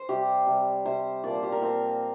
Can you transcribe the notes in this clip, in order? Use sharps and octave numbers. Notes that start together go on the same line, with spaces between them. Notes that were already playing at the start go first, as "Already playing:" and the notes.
Already playing: C5
C3 G3 G4
C3 G3
C3 G3 C5
A#2 F3 D5
C5
G4
A#4
A#2 F3 C4